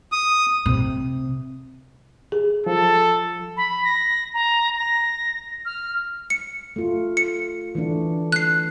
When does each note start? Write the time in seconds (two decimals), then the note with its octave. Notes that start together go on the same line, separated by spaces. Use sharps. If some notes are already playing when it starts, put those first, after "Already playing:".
0.12 D#6
0.66 C3
2.32 G#4
2.66 F3 A4
3.57 B5
3.85 A#6
4.34 A#5
4.78 A#6
5.65 F6
6.30 C#7
6.76 A3 F4
7.17 C#7
7.75 E3 A3 D4
8.32 F#6 C7